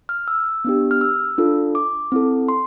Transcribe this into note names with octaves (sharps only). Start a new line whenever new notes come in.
F6
E6
B3 D4 G4
F6
E6
D4 F4 A4
D6
C4 E4 A4
C6